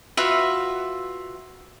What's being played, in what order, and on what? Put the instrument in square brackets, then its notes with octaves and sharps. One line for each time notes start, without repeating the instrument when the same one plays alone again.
[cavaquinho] F4 F#4 B4 E5